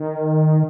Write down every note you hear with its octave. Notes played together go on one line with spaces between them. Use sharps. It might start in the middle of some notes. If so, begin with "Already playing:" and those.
Already playing: D#3